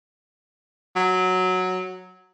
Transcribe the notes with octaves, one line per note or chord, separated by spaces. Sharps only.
F#3